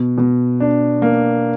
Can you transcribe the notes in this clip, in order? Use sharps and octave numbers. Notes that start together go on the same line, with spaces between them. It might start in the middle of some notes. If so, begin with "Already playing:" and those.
Already playing: B2
B2
D4
A#3